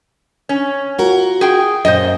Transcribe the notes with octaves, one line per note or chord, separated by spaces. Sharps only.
C#4
F4 F#4 A#4
G#4 G5
F#2 A#2 C5 D#5